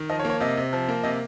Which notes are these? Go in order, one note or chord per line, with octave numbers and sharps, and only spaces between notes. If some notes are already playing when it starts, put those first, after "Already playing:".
Already playing: D#3
F3 D#5
C#5
A#3
C#5
C3 D#5
C3
F3
A#3
C3 D#5